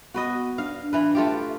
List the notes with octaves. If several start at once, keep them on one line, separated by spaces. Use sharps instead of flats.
B3 F#4 B4 D#5
D4 F5
E3 B4
A3 F4 G4